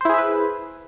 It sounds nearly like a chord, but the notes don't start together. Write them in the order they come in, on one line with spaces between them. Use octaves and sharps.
C5 E4 G#4 E5 B4